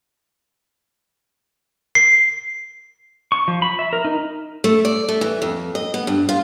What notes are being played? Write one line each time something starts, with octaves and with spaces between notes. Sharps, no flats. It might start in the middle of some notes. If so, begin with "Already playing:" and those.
C7
C#6
F3
B5
E5
A#4
D#4
A3
D5
A3
E3
F2
D#5
B3
G2
F4